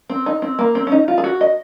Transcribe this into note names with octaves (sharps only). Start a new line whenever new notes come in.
C4
D#4
C4
A#3
C4
C#4
D#4
F4
G#4
F#4
D#5